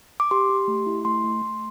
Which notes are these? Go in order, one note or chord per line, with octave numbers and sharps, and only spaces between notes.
D6
G4 C6
G4
A3
E4
A3 C6
A3
A3